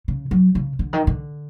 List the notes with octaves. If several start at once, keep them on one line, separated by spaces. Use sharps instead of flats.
C#3
F#3
C#3
D3
D#3
D3